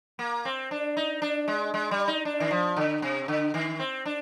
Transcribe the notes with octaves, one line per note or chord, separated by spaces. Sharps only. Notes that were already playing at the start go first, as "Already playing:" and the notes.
A#3
C4
D4
D#4
D4
G#3
G#3
G3
D#4
D4
D#3
F3
D3
C3
D3
D#3
C4
D4